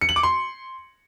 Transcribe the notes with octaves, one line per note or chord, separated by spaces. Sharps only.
C#7
F#7
D6
C6